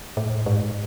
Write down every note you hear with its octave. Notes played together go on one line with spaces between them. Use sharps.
A2
G#2